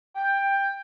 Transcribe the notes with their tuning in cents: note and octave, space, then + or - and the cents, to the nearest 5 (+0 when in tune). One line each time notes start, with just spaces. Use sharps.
G5 +15